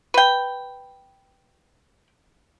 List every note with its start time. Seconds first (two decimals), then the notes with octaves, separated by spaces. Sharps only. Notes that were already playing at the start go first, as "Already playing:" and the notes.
0.14 B4 G5